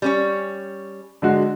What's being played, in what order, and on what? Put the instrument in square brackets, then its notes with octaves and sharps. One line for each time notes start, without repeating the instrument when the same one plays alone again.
[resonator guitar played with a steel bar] G3 C#4 C#5
[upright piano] D3 G#3 F#4